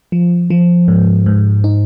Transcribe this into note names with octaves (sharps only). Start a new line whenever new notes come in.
F3
F3
G#2
G#2
D#4